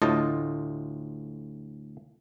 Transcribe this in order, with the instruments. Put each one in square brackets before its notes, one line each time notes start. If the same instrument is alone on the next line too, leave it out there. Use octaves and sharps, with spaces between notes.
[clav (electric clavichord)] D2 A2 F4 D#5 F5 A5